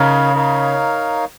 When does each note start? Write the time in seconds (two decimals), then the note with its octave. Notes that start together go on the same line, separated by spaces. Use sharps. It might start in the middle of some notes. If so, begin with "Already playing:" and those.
Already playing: C#3 D#4 A#4 C#5 F5
0.34 D#4 A#4 C#5 F5